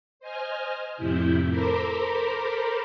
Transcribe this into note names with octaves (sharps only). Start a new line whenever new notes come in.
C5 D#5 G#5 F6
F2 A2 C3 E4 G6
A4 A#4 C5 A#5 B5 D6